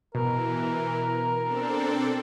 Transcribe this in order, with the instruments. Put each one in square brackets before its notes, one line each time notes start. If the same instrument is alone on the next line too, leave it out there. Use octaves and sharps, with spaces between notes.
[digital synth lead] B2 [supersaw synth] E3 [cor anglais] A#4
[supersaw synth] C4 D4 A4